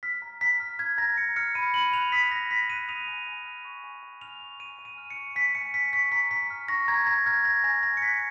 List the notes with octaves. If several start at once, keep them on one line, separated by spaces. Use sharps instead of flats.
F6 B6
A#5
A#5 B6
F6
F6 G#6
A#5 A#6
A#5 C#7
F6 C#7
B5 D#7
B5 F#7
F#6 F7
D#6 B6
B5 A#6
B5 B6
F#6 D#7
D#6 F7
G#5
G#5
F6
C#6
G#5
G#5
F6 F7
C#6
G#5 D#7
G#5
D#7
F6
C#7
C#6
G#5 B6
G#5 C#7
F6 B6
C#6 B6
A#5 B6
A#5 B6
F6
C#6 A#6
A#5 G#6
A#5 A#6
F6 G#6
C#6 A#6
G#5 A#6
G#5 A#6
C#7
F#6 B6